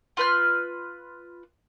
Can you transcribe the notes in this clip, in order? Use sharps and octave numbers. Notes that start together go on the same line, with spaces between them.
F4 B4 F6